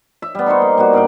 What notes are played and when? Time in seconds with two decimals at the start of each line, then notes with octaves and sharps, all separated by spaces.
0.22 E5
0.35 G3 B3
0.46 D#4 B4 C5 C#6
0.62 A#3
0.77 G3 A#3 B3 F#4
0.93 G2 D5 F5 G5